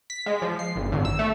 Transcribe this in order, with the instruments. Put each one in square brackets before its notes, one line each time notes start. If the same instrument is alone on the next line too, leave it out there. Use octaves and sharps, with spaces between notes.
[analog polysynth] B6
G#3
F3
C7
G1
G#1
E6
A3